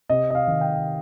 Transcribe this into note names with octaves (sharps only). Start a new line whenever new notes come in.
C3 D#5
D#5
F5
D#3
G5